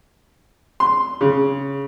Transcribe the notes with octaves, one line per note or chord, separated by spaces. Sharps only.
C6
C#3